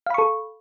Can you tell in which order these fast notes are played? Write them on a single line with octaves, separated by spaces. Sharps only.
F5 B5 C#6 A4